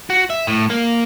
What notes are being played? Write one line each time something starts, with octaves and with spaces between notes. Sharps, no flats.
F#4
E5
A2
A#3